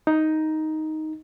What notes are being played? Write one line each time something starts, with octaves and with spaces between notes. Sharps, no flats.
D#4